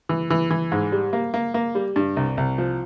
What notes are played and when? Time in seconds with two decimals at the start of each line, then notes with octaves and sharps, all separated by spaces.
0.09 E3
0.30 E3
0.50 E3
0.72 G#2
0.92 G3
1.13 A#3
1.34 A#3
1.54 A#3
1.75 G3
1.96 G2
2.17 C2
2.37 C2
2.58 F3